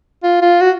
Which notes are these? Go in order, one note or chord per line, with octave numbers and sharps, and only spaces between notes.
F4
F4
F#4